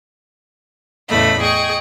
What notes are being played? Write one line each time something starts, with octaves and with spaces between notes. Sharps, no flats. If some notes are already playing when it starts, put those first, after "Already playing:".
E2 A2 C#3 A3 D#5 B5
G#4 D#5 G5 C#6